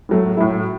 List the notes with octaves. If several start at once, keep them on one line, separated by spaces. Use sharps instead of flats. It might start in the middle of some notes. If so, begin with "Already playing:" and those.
A2 F#3 A3
A2 F#3 A3 E4